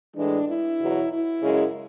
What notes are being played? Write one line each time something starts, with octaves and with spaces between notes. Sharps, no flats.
A2 E3 G#3 D4
E4
E2 B2 F#3
E4
F#2 C#3 G#3